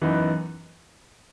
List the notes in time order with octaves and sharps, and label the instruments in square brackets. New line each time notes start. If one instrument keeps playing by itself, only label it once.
[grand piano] F#2 E3 B3 D#4